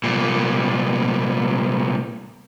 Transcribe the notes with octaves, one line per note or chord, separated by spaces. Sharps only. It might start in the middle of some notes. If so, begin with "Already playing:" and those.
C2 A#2